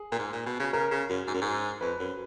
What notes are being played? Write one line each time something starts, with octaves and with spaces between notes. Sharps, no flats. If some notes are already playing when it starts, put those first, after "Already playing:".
Already playing: G#4
A#2
G#2
A#2
B2
C#3
C#3 A#4
C#3
F#2
G#2
F#2
G#2
F2 B4
F#2